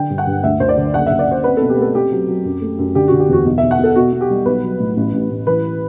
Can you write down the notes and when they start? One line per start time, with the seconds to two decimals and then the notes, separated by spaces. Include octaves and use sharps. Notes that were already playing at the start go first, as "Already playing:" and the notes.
Already playing: D3 G5
0.10 G2
0.18 F#5
0.27 G2
0.43 D2 E5
0.60 D2 C5
0.69 D5
0.77 D3
0.94 F#1 F#5
1.06 E5
1.11 F#1
1.19 D5
1.27 F#1 C5
1.44 C4 B4
1.57 A4
1.62 B2
1.70 G4
1.78 A3 A4
1.95 C4 G4
2.11 F#3
2.28 F#3
2.45 F#2
2.62 A3
2.79 F#2
2.95 D3 G4
3.08 F#4
3.12 D3
3.20 G4
3.29 E2 F#4
3.45 B1
3.58 E5
3.62 B1
3.71 F#5
3.79 B2 A4
3.95 B2 F#4
4.13 B2
4.21 G4
4.29 G3
4.46 B1 B4
4.63 F#3
4.80 A2
4.97 A1
5.13 A1
5.30 A1
5.47 E3 B4